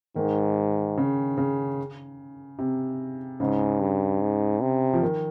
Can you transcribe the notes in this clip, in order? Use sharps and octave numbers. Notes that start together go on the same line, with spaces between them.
G#2 D#3
C#3
C#3
C3
G#2 C#3
G2
G#2
C3
F3
D#3